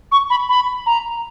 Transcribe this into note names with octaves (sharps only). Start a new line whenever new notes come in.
C#6
B5
B5
A#5